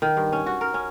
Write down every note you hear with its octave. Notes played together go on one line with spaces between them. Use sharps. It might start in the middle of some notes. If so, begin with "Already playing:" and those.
D#3
G2
C#4
F#4
A#4
C#4